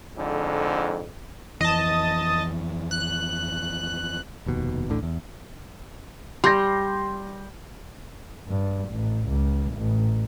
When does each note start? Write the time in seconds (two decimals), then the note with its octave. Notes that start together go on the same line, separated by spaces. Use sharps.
0.17 F2 G#2 D3
1.61 F2 E3 D#5 A5
2.91 F#6
4.46 F1 D#2 B2
4.88 A1 D2 A2 D3
5.03 E2
6.44 G3 C6 G6 A#6
8.48 G2
8.90 A1
9.29 C#2
9.74 A1